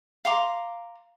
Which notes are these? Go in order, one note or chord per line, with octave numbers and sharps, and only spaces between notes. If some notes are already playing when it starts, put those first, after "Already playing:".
F5 A#5 C6 D6